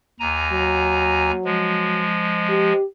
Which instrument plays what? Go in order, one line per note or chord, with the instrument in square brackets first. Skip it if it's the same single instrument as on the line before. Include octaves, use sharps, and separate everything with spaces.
[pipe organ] D#2 G#5 A#5
[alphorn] F#3
[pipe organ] F3 G#3
[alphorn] G4